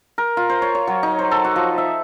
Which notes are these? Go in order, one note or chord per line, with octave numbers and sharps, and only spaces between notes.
A#4
F4
C5
C#5
C#5
F#3
D#4
C5
A4
F#4
F3
E5